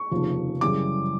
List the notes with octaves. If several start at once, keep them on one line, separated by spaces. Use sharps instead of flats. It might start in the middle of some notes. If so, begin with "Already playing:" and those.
Already playing: C#6
F1 D#2 C#3 F3 A#3
F#2 C#3 E3 G3 D6